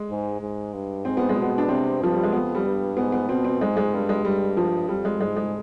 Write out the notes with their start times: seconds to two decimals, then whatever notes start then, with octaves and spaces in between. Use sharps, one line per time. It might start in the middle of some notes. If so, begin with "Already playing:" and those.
Already playing: G#3
0.09 G#2
0.41 G#2
0.73 G2
1.05 G#2 C4
1.17 B3
1.29 G#3
1.37 B2 B3
1.58 D4
1.69 C3 C4
2.01 G2 F3
2.14 G3
2.23 G#3
2.32 F2 B3
2.55 G3
2.65 G2
2.97 G#2 B3
3.12 B3
3.29 B2 C4
3.44 C4
3.60 G#2 G#3
3.77 G#3
3.93 G2 G3
4.09 G#3
4.25 G2 G3
4.57 F3
4.89 F2 G3
5.05 G#3
5.21 G#2 G#3
5.37 G#3